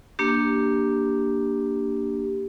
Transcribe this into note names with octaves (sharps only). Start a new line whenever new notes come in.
A#3 D4 G4